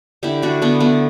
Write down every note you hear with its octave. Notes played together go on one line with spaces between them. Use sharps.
D3 E4 G4
A3 D4 F#4
D3 B3 D4
A3 B3